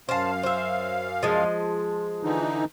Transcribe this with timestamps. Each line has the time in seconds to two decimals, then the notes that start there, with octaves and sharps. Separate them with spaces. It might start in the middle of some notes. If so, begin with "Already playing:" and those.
0.09 F#2 C5 F5 A5
0.43 C5 E5
1.23 F3 G#3
2.23 D3 E3 D#4